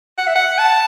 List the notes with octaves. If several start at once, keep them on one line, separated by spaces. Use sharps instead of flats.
F#5
E5
F#5
A5